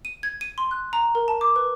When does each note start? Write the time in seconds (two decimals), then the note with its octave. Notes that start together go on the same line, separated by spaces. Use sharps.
0.05 D#7
0.23 G#6
0.41 D#7
0.58 C6
0.71 F#6
0.93 A#5
1.15 A#4
1.28 A5
1.41 D6
1.56 B4